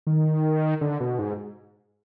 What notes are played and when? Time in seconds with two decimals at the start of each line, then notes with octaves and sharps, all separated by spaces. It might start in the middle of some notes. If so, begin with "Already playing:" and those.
0.07 D#3
0.81 D3
1.00 B2
1.19 G#2